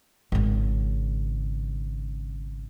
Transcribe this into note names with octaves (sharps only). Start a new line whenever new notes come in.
G#1 C#3